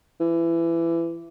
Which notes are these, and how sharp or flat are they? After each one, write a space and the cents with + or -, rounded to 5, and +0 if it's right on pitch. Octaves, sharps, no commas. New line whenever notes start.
E3 +20